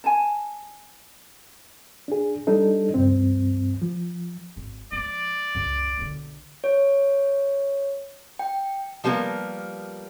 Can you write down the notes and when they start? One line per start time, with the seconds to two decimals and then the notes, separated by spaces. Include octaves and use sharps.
0.04 G#5 A5
2.08 D4 G#4
2.47 G3 D4 D#4 A4
2.94 C#2 G2 C4
3.82 F3
4.56 G#1
4.92 F3 G#3 D5
5.55 C#2 F#2
5.98 B1 D3
6.64 C#5
8.39 G5
9.04 F3 G3 A#3 B3 A#4